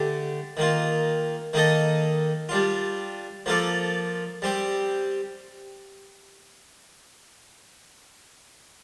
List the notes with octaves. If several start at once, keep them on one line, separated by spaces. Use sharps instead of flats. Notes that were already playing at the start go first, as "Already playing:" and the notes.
Already playing: D3 A3 D4 G4
D#3 A#3 F4
D#3 A#3 D#4 A4 D#5
G3 D4 F4
F3 A#3 F4 A4 D5
G3 C4 G4